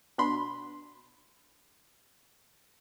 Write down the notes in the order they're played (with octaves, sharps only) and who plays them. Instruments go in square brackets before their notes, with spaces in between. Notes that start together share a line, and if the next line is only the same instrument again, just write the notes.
[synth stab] B2 D4 B5 C6